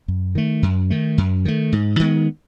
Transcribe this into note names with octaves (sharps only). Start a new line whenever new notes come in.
F#2
D#3 A3
F#2
D#3 A3
F#2
D#3 A3
G#2
D#3 G#3 B3